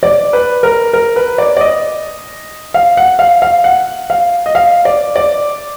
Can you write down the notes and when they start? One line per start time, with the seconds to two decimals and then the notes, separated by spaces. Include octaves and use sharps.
0.03 D5
0.33 B4
0.63 A#4
0.93 A#4
1.16 B4
1.38 D5
1.57 D5
1.61 D#5
2.74 F5
2.97 F#5
3.19 F5
3.42 F5
3.64 F#5
4.10 F5
4.46 D#5
4.55 F5
4.85 D5
5.16 D5